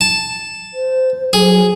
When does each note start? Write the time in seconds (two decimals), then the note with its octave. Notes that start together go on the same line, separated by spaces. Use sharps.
0.01 A5
0.74 C5
1.33 F#3 G#4